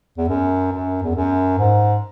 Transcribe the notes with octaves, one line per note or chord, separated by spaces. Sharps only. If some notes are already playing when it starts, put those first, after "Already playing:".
E2
F#2
F#2
E2
F#2
G#2